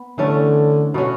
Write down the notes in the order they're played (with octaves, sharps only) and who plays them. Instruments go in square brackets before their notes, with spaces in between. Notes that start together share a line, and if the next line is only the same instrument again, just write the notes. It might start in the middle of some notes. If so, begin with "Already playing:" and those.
Already playing: [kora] B3
[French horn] D3 [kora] E3 A3 C#4
[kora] B2 A3 C#4 F#4